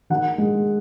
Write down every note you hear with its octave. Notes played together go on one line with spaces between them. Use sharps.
D#3 F#5
G#3